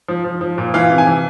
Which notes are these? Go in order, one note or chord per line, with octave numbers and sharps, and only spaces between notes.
F3
F3
F3
A#2
E3 F5
C3
G#5
E3